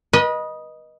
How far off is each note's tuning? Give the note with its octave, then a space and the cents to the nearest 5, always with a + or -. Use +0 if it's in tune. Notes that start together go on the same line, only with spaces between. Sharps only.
B4 -30 D#5 +0